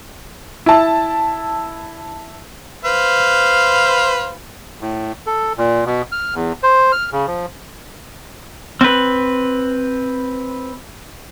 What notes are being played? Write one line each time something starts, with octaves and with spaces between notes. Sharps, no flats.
E4 A5
B4 C5 F5
A2
A4
A#2
B2
F6
E2
C5
F6
C#3
F3
C4 B4